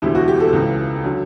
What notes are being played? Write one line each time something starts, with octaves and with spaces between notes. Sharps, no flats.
E1 D2 D3 G3 E4
F#4
G4
A4
C#2 C#3 E3
D3 F#3